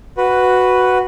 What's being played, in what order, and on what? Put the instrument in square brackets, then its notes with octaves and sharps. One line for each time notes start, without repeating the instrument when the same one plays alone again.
[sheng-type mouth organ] F#4 B4